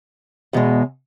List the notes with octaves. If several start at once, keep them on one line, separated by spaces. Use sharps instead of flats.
E2 B2 G#3